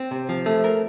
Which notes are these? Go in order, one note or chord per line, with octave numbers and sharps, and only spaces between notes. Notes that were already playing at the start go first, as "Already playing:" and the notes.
Already playing: C4
C3
F3
A3
A#4